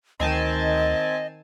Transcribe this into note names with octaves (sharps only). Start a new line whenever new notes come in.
D2 D#3 C4 D#5 G#5 A5